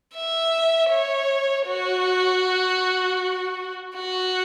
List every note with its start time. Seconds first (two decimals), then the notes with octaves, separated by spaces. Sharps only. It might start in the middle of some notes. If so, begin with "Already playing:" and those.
0.15 E5
0.91 C#5
1.68 F#4
3.96 F#4